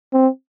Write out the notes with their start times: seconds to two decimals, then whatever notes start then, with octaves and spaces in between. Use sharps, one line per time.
0.14 C4